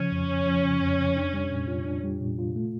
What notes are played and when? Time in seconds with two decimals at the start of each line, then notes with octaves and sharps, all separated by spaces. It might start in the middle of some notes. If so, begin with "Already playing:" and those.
Already playing: C#3 F3 C#4
0.12 F2
0.29 F2
0.46 F3
0.63 C#3
0.81 F2
0.98 F2
1.17 D4
1.34 G3
1.51 A#2
1.68 F4
1.85 D4
2.03 G3
2.21 A#2
2.39 F4
2.56 A3